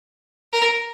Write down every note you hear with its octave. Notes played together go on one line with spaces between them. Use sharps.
A#4